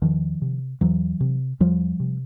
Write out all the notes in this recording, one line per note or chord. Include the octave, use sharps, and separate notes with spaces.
E2 D#3 F3
C3
E2 E3 F#3
C3
E2 F3 G3
C3